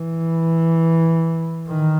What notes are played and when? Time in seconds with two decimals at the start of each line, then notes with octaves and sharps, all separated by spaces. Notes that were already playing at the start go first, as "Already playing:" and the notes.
Already playing: E3
1.69 D#3